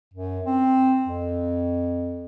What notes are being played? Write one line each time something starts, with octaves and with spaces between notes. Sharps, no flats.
F#2
C4
F2